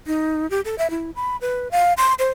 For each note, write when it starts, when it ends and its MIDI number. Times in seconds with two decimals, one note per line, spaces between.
0.07 0.49 63
0.50 0.61 67
0.65 0.75 69
0.78 0.90 76
0.90 1.11 64
1.15 1.37 83
1.41 1.68 71
1.71 1.93 77
1.97 2.14 84
2.19 2.30 72